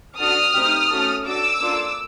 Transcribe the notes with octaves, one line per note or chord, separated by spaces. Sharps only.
D4 F#4 A4 D#6 F6
A3 C4 D#4 G4
A3 C#4 F#4 A4
D4 F#4 A4 D6 E6
A#3 D4 F4 A4